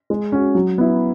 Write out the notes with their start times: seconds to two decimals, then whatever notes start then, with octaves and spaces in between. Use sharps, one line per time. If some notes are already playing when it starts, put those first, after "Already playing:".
0.10 G#3
0.32 C#4 F#4
0.55 F#3
0.78 B3 E4